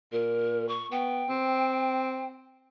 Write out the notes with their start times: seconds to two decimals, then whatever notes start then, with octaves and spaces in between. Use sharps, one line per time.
0.13 A#2 A#4
0.69 C#6
0.92 B3 G5
1.29 C4